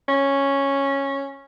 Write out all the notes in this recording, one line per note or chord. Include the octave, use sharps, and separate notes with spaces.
C#4